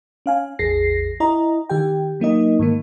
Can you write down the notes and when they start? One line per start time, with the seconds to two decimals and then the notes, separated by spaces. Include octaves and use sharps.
0.26 C#4 F5 G#5
0.59 A1 E2 G#4 A#6 C7
1.20 E4 D#5 A#5
1.70 D#3 G4 G5
2.20 F#3 A#3 D#4 D#5
2.59 G#2 D#3 A#3